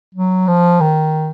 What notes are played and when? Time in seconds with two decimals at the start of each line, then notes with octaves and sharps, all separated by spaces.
0.15 F#3
0.48 F3
0.81 D#3